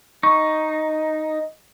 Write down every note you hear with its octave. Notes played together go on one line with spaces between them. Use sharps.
D#4 D#5 C#6